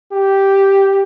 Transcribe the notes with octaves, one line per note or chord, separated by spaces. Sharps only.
G4